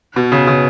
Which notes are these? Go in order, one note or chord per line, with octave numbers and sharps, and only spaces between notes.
B2
C#3
C#3